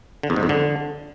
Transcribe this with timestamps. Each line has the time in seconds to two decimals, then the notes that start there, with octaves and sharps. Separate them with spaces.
0.23 D3
0.30 E2
0.36 G#2
0.43 F2
0.49 D3